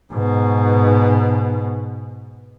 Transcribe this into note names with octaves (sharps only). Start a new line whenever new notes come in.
G#2 B2